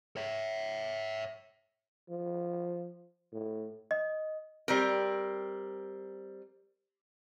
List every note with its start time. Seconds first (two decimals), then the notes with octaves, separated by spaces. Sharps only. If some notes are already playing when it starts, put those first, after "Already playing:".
0.17 C#5 E5
2.09 F3
3.33 A2
3.91 D#5
4.68 G3 C4 A#4